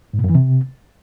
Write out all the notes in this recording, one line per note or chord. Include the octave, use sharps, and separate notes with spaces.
G#2
A#2
F#2
E3
C3